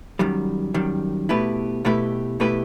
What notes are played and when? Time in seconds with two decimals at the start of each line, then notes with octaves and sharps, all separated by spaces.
0.19 F#2 D#3 G3
0.74 F#2 D#3 G3
1.29 B2 A3 E4 G4 B4
1.85 B2 A3 E4 G4 B4
2.40 B2 A3 E4 G4 B4